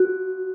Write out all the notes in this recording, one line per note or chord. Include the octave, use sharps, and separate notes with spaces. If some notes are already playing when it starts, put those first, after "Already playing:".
Already playing: F#4